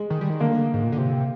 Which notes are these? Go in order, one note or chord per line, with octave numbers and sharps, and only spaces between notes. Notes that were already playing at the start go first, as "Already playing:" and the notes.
Already playing: G#3
D#3
G3
D#3
D3 A#3
G#2
A#2
D3
C3